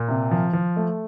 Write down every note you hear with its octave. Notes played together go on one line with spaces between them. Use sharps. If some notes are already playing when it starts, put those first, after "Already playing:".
Already playing: A#2
C3
F3
F3
A3